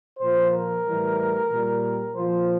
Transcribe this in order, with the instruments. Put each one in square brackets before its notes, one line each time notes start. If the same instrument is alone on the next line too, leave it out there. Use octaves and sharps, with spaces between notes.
[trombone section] A#2 F3 C5
A#4
A2 E3 G3
A#2
G3
A#2 F3 C5